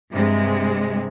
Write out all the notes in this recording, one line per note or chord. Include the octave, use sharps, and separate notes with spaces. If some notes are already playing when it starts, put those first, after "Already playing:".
G2 C3 G#3